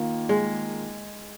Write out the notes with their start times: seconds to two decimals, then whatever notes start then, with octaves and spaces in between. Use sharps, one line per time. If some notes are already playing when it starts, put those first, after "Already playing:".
Already playing: D#3 A#3 D#4 F4
0.29 G#3